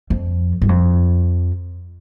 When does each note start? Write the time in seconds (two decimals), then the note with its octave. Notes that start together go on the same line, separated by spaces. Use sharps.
0.10 F2
0.62 G2
0.69 F2